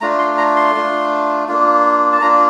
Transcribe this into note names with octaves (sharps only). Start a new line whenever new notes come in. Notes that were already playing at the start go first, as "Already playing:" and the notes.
A3 D4 F4 A#5
C6
A#5
C6
A3 D4 F4
A#3 D4 F4
A5
A#3 D4 F4 A#5